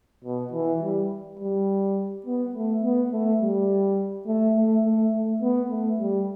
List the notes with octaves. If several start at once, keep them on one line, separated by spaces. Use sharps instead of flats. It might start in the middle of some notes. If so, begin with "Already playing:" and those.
B2
E3
G3
G3
B3
A3
B3
A3
G3
A3
A3
A3
A3
B3
A3
G3